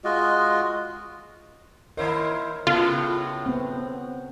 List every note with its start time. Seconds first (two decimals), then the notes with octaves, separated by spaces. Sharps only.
0.04 G#3 F4 F#4 D#5
1.97 D#3 E4 A#4 C5 C#5 D#5
2.67 A2 C#3 B3 F4 F#4 A4
3.46 B3 C4